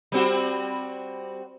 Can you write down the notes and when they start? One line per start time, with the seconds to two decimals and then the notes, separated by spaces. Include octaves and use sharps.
0.12 G3 C4 F#4